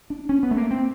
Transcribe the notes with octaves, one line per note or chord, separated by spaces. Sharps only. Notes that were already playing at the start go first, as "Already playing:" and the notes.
D4
C#4
B3
A3
A#3
C4